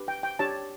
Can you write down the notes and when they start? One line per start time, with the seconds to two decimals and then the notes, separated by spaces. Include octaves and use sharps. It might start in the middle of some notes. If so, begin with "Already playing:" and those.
Already playing: D4 G4 B4
0.08 G5
0.23 G5
0.39 D4 G4 C#5 A5